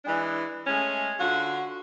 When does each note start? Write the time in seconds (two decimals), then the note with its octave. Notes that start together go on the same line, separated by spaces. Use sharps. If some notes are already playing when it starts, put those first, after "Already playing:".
0.05 E3 G#3 D4
0.66 G#3 A3 C#4
1.19 D3 F4 F#4